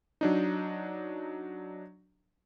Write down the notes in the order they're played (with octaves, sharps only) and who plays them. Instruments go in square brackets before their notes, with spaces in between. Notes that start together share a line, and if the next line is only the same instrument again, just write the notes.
[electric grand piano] F#3 D4 D#4